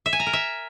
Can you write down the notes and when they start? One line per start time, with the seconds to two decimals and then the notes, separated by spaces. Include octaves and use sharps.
0.06 E5
0.13 G#5
0.20 A#5
0.26 A#4
0.33 E5